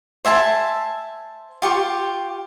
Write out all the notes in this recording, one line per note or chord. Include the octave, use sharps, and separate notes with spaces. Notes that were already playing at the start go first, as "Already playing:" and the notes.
C5 E5 G#5 A5
F4 G4 C#6